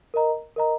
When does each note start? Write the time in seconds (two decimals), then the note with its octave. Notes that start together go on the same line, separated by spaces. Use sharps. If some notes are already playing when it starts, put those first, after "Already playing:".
0.14 A#4 D#5 A#5
0.56 A#4 D#5 A#5